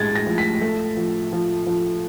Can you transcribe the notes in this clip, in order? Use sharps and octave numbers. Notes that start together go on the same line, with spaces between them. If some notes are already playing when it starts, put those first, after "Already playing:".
Already playing: A2 G#3 G#6 A6
A#6
F3
B6
A3
F3
F3
F3